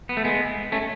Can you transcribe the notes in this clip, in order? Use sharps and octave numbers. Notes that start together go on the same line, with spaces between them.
B3
A3
G#3 B3
A3 C#4